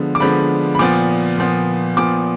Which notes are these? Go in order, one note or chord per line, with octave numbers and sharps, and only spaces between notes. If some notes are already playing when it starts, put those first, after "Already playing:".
Already playing: D3 F3 G#3 B3
D6
D3 F3 G#3 B3 B5
B5
A#2 F3 B3 D6
A#2 F3 B3
A#2 F3 B3 D6